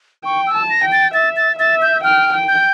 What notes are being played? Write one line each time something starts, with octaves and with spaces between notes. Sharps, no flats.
G5 C#6
E6
A5
A#6
G5
A6
E5 A6
A6
E5 A6
G6
G5 F6
G5
G6